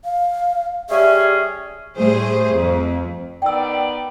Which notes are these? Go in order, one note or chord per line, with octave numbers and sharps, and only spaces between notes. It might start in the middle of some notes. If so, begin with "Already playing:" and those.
F5
G3 C#4 G#4 E5
A2 G3 A3 G#4 C5
F2
D#3 B3 D5 G5 E6